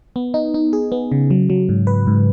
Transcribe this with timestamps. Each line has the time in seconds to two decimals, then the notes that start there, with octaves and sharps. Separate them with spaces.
0.16 B3
0.34 D#4
0.54 D#4
0.73 G#4
0.92 B3
1.12 C#3
1.30 F#3
1.50 F#3
1.69 G#2
1.87 B4
2.07 G#2